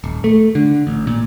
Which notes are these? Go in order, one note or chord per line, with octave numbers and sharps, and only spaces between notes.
D#1
A3
D3
A1
A#2